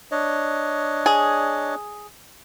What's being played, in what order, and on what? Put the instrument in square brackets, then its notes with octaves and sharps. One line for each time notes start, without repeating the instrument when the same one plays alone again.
[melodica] D4 C#5 D#5
[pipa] G#4